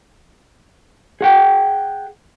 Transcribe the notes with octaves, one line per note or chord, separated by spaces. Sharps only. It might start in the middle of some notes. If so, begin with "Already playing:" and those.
G#4 F#5 G5